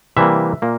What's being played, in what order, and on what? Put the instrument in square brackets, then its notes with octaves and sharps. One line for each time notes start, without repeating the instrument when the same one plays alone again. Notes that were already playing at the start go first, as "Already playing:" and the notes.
[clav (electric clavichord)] C3 E3 G3 A#3 E5
A#2 A#3